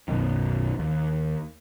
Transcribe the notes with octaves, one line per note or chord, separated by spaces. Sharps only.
B1 F#2 B2 D#3
D#2